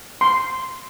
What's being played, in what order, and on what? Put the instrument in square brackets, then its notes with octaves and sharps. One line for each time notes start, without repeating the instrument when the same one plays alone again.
[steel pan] C6